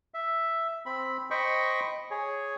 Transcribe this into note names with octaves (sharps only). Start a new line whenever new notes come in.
E5
C4 B5
C5 D#5 G5 B5 C#6
G#4 C#5